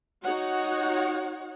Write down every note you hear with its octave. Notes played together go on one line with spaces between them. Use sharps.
D#4 F#4 C#5 F#5